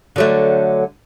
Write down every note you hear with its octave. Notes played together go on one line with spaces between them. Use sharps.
D3 F#3 A3